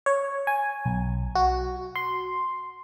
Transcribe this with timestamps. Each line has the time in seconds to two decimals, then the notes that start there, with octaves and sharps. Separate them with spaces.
0.06 C#5
0.47 G#5
0.85 B1
1.35 F#4
1.96 C6